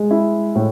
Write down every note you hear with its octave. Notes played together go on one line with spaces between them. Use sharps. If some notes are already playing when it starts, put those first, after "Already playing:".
Already playing: G#3
E4
A2